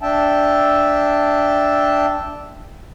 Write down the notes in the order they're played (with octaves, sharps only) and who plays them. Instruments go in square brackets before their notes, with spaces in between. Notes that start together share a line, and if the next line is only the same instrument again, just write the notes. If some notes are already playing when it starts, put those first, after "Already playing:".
[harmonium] D4 E5 G5 A5